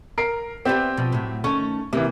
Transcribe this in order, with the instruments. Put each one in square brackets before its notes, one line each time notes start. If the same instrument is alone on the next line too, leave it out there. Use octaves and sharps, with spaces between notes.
[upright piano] A#4 C7 D7
[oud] B3 D5 E5 [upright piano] C4 G4
[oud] B2 F3
A2 F#3
[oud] D#3 A3 C#4 [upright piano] C#6
[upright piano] C3 E3 [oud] A#3